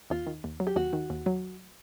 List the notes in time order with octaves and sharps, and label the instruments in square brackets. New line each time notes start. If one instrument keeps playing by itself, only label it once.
[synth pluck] D#2 [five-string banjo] F4
[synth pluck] D#3
D#2
F#3
[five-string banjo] G4
[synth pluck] D#2 [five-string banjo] F#4
[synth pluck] D#3
D#2
F#3